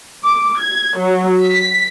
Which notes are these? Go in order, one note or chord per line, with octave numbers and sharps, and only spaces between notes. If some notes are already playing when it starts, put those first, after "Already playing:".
D6
G#6
F#3
B6